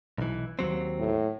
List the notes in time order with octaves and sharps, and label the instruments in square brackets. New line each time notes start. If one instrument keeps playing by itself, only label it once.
[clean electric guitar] B1 E3
D#2 F#3 C4
[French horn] A2